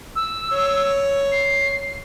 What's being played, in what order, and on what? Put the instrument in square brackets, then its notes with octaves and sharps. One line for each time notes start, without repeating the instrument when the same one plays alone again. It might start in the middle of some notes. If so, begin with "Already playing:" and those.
[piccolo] E6
[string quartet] C#5
[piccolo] C7